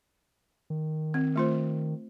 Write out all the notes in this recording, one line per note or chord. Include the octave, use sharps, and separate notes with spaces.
D#3
C4
A3 F4 C5